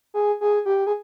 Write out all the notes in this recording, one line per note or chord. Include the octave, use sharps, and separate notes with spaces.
G#4
G#4
G4
G#4